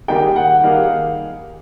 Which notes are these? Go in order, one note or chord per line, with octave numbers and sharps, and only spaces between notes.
D#3 G3 A#3 D#4 G#4 G5
F#5
D#3 G3 A#3 D#4 G#4 F5